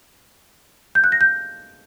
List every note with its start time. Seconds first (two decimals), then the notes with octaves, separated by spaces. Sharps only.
0.95 G6
1.04 F#6
1.12 A#6
1.21 G6